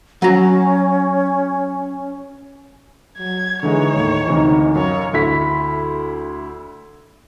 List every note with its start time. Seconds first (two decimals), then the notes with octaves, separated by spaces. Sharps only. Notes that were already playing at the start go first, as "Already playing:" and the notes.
0.22 F#3 C#4 A#5
3.18 F#3 G#6
3.63 D3 E3 G#3 D#4 C#5
3.96 D#2 A2
4.28 D2 C3 E3 D#4 A#4
4.76 F#2 C#5 F5
5.13 D2 E4 B6